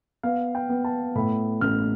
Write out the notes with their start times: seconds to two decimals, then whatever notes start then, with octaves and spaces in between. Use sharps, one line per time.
0.23 B3 F5
0.55 G5
0.69 B3
0.85 A5
1.15 A2 B5
1.61 A1 F6